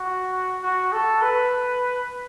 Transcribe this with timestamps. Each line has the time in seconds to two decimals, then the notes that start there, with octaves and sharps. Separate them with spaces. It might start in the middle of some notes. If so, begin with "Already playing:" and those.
Already playing: F#4
0.62 F#4
0.92 A4
1.22 B4